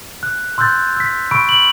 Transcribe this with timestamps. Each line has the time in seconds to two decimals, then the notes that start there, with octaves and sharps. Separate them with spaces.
0.23 F#6
0.58 C6 E6 F#6 G6 A6
0.96 E6 B6
1.31 B5 C#6 E6 D7
1.49 F#7